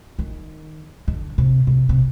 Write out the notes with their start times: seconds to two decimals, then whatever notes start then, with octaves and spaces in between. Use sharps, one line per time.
0.19 D#3
1.08 D3
1.38 C3
1.67 C3
1.89 C3